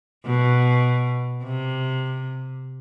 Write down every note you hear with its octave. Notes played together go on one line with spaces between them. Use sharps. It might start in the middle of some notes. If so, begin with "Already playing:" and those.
B2
C3